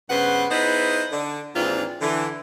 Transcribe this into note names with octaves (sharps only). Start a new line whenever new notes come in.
G2 C#3 B3 B4 C5 F#5
B3 D#4 E4 G#4 B4 C5
D3
D#2 G#2 E3 C4 D4 F4
D3 E3